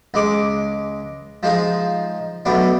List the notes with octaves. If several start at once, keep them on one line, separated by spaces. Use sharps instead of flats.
C#2 G#3 D6
F3 G#3 D#4 F4
B1 F#2 A3 B3 D4